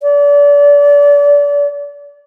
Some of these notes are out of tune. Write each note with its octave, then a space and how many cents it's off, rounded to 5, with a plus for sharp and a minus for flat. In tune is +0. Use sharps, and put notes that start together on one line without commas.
D5 -30